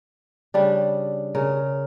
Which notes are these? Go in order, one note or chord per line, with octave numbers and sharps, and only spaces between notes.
C#3 G3 D4
C#3 A#4